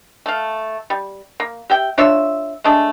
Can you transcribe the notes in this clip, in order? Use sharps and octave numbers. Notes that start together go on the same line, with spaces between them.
A3 F5
G3
A#3
G4 E5 G5
D4 F4 C#5 E5
G#3 A3 D4